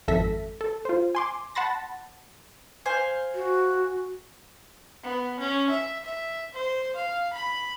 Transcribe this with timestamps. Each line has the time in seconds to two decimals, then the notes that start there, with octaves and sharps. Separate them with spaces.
0.08 G#1 F2 A4 E5 A#6 B6
0.61 A4
0.85 F4 C5
1.15 G#5 C6 D6
1.55 F#5 A5 B5 C6 A6 A#6
2.86 C5 F5 G#5
3.35 F#4
5.04 B3
5.40 C#4
5.70 E5
6.05 E5
6.54 C5
6.96 F5
7.33 B5